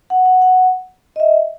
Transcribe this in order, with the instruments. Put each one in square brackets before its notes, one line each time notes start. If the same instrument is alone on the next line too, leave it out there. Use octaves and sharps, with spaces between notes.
[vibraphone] F#5
F#5
F#5
D#5
E5